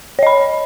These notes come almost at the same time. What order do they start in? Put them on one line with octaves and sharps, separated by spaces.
C#5 D#5 B5